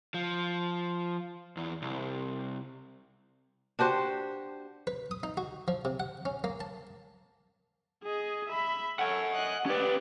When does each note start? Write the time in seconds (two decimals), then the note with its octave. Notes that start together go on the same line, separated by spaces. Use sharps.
0.14 F3
1.57 E2
1.82 C2
3.79 D4 F#4 G4 C5
4.87 B4
5.11 D#6
5.23 D#4
5.37 F#4
5.68 F3
5.85 C3
6.00 F#5
6.25 C#4
6.44 A#3
6.61 A5
8.04 G#4 D#5
8.49 E5 B5
8.99 A4 C#5 F#5 G#5
9.34 D#5 F#6
9.66 C#4 G4 B4 D5